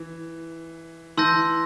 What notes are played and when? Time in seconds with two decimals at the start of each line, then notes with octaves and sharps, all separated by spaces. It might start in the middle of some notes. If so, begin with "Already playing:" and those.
Already playing: E3
1.17 E3 A5 C6 E6 G6 A#6